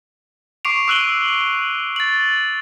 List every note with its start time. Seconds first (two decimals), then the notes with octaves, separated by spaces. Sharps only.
0.65 C#6 D6 C7 D7 F7
0.88 D6 E6 F#6 D#7 F#7 G7
1.96 A6 F#7